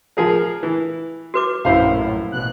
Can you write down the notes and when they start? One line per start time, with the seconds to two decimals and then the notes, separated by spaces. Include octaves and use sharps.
0.17 F3 G#4 A#4
0.63 E3
1.34 F#4 B4 D6
1.65 A#1 F#2 A2 E4 C5 F5
2.32 A1 B2 F#6